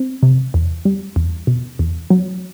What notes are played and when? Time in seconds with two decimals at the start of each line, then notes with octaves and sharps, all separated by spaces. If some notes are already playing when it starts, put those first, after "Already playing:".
Already playing: C4
0.23 C3
0.54 E2
0.85 G3
1.16 E2
1.47 B2
1.79 E2
2.10 F#3